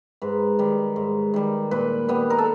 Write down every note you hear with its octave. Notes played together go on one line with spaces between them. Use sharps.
G#2 B4
D#3 G3
G#2
D#3 G3
A#2 B4
G3 B3
A#4
A4